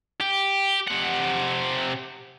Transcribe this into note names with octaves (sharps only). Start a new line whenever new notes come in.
G4
C3 F#5